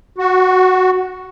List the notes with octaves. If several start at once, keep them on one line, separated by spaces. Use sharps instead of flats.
F#4